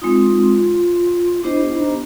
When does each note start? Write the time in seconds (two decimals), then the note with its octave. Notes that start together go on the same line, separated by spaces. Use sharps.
0.01 G#3 C4 D#4 F4
1.43 B3 D4 E4 G4 C5 D#5
1.61 E4
1.78 D#4